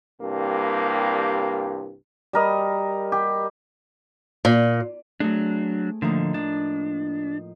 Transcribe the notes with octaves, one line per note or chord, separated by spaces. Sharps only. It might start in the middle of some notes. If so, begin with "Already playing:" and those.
C2 G2 G3 A#3
G3 A#4 D#5
G4
A#2
F#3 A3 C4 D4 G#4
A2 D3 F3 A#3 D#4
F3 D4